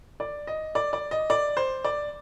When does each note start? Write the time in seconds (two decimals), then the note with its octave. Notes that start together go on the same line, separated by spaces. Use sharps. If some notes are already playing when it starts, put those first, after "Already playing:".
0.20 D5
0.47 D#5
0.75 D5
0.93 D5
1.11 D#5
1.30 D5
1.57 C5
1.84 D5